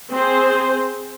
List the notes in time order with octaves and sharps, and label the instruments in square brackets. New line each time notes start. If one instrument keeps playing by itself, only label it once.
[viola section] C4 G#4 C5